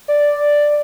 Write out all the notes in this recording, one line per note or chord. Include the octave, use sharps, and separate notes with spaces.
D5